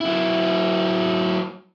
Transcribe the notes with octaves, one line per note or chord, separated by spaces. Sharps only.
F#3 E4